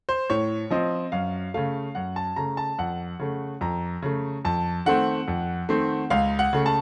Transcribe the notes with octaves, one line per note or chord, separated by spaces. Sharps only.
C5
A2 C#5
F3 C4 D#5
F#2 F5
C#3 A3 F5
F#2 F#5
A5
C#3 A3 A#5
A5
F2 F#5
C#3 A3
F2 A#5
C#3 A3
F2 A5
D#3 A3 C4 F#5
F2
D#3 A3 C4
C#2 F5
F#5
C#3 A3
A5